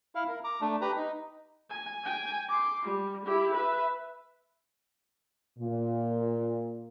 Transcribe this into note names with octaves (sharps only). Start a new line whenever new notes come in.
E4 F5
A#4
A#5 D6
A3 D4
G4 B4 A#5
D#4
G#5
G5 G#5
C6 D6
G3
E4 G4
B4 E5
A#2